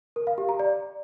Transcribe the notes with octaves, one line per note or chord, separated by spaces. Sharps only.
A#4
F5
G4
A#5
D5